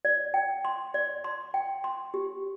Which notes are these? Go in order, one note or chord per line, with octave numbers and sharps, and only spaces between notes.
D5
G5
C6
D5
C6
G5
C6
G4